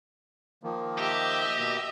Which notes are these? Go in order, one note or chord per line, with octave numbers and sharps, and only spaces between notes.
D#3 F3 A#3
G4 D#5 E5
B2 A#3